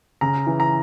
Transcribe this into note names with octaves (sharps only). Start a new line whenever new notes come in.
C#3 A#5
E3
A#5